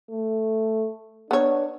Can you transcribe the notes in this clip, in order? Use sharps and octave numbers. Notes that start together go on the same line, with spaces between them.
A3
B3 D4 C#5